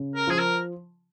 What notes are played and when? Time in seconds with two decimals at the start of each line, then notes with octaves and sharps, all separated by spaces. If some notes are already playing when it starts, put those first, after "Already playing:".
Already playing: C#3
0.15 A#4
0.27 F3 G#4
0.39 A#4